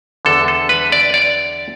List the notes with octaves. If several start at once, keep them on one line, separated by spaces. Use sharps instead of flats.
E2 D3 A4
A4
B4
D5
D5